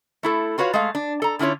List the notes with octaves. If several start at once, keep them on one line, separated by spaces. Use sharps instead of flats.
A3 E4 A4
F4 F#4 B4 C#5 F5
G#3 A3 F5
D4
A4 A#5
D3 C#4 E4 F4 C#5